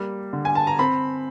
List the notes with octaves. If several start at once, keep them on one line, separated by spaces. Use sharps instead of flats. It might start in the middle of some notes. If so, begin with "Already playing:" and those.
Already playing: G3 A#3
D3
G#5
A5
A#5
C4 B5